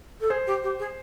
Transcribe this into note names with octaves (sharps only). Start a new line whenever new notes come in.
A4
G#4 C5
G4
G4
G#4